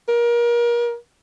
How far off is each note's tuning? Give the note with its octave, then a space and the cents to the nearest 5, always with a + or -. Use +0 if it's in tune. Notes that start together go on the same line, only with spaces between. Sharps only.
A#4 +30